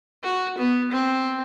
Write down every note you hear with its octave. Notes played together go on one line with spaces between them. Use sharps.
F#4
B3
C4